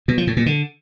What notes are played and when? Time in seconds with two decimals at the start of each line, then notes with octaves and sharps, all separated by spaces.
0.08 B2
0.18 F3
0.27 A2
0.37 A#2
0.46 D3